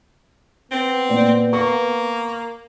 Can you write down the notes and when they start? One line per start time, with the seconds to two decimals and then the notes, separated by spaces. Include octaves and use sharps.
0.71 B3 C4
1.09 A#2 D5
1.53 A#3 C#6